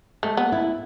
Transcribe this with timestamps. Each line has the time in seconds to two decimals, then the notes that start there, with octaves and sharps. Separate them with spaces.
0.23 G#3 A3
0.37 B3
0.52 E4